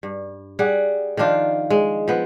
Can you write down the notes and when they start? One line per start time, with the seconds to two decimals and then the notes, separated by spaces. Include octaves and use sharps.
0.03 G2
0.59 G3 G#4 F#5
1.17 D#3 F3 D4 F4
1.70 G#3
2.08 F3 B3